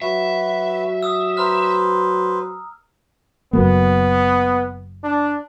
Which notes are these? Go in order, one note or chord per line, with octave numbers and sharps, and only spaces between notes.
F#3 F#4 B4 E5
D#6 E6
B4 C5 A#5 F6
F#1 F#3 A#3 B3
D4